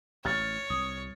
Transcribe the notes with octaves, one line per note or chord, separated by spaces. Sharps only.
A1 C#5 F6 A6
C2 D#6